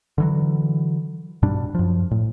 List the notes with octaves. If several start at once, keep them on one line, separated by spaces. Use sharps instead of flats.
D3 E3 F#3
G2 B2 G3 D4
F#2 F3
A2